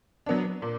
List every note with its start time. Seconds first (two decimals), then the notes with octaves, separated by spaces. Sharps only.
0.26 F#3 B3 D4
0.62 A#2